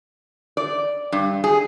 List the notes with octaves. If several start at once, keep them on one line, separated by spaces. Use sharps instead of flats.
D5
G2
G#4